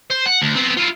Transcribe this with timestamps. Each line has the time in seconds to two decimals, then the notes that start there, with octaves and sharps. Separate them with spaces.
0.10 C5
0.26 F#5
0.42 D2
0.56 B3 C4
0.77 E4 F4